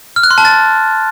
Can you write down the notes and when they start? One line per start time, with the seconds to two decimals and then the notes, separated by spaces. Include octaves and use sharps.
0.16 F6
0.23 F#6
0.31 C6
0.38 A5
0.45 A6